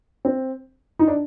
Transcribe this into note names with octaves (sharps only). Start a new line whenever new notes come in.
C4
D#4
D4